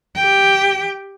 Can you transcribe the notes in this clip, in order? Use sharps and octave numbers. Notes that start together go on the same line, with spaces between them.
G4 G5